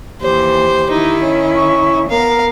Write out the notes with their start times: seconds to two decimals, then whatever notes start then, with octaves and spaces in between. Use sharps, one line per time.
0.21 D#2 E3 G4 C5
0.90 D#3 D#4 E4
1.23 C#4
1.56 C#6
2.10 B3 A#4 F5